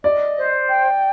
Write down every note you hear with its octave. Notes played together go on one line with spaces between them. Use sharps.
D5 D#5
C5
G5